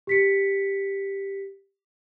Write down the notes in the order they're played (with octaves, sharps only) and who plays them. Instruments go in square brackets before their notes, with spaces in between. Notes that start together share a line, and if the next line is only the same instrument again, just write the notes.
[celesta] G4 B6 C#7